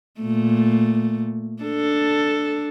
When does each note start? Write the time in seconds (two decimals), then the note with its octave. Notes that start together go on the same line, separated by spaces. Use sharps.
0.21 A#2 A3
1.63 D4 A4